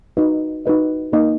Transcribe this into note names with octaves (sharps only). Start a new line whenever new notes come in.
D#4 F#4 B4 D#5
D#4 F#4 B4 D#5
A#3 D#4 A#4 D#5